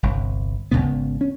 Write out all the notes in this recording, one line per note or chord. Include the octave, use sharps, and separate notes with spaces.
G1 C2
G#1 F#2 C#3 B3
C#4